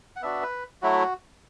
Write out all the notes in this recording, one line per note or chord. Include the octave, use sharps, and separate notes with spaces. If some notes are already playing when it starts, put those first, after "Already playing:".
F#5
B3 D4 F#4 E5
B4
F#3 A3 E4 F#4